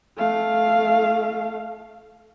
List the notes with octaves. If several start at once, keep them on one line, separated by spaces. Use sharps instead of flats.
A3 F5